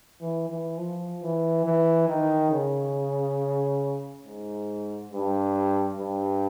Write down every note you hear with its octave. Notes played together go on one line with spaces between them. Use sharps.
E3
E3
F3
E3
E3
D#3
C#3
G#2
G2
G2